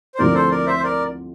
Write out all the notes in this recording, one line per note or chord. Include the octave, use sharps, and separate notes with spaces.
C5
D2 D3 F3 C4 E4 A#4 D5
A4 C5
A#4 D5
C5 E5
C5
A#4 D5